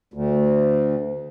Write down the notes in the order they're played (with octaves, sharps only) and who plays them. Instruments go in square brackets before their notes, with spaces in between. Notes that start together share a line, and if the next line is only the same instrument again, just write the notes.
[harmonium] D2